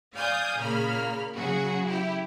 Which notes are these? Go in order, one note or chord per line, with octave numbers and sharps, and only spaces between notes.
D5 F5 G#5 D#6 G6
A#2 C#3 A#3 B5 F6
C#3 F#3 F#4 G#4
E4 G4